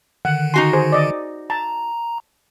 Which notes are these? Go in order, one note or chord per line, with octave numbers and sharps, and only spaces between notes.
D3 D#3 F#5
D#4 F#4 G#5 C6
G#4 C5
D5 D#5
A5 A#5